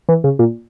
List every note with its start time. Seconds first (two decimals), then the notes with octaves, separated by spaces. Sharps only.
0.09 E3
0.24 C#3
0.39 A#2